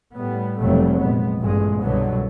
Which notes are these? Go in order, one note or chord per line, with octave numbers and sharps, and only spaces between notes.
A2 G3 B3
F1 B2 F#3 G3 A3
A#2 G#3 B3
A1 G2 A#2 G#3
C2 G2 B2 D3 F#3 B3